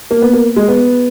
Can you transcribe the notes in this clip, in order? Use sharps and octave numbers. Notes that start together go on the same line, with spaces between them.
A#3
B3
A#3
G#3
B3